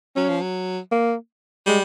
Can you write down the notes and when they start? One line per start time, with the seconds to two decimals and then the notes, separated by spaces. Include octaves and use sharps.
0.16 F#3 C#4
0.29 F3
0.41 F#3
0.91 A#3
1.66 G3 G#3